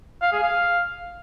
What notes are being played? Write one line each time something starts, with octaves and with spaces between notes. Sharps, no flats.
F5
G#4
F5